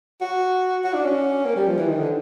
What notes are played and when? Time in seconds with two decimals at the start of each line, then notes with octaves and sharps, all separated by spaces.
0.21 F#4
0.84 F#4
0.94 D4
1.05 C#4
1.45 A#3
1.56 G3
1.66 F3
1.78 E3
1.88 D#3
1.99 D3